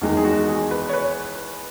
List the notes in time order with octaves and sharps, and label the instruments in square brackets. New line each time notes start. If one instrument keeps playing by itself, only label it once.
[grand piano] E2 D#3 G#3 D#4
[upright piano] G#4
F#4
G#4
B4
C#5
B4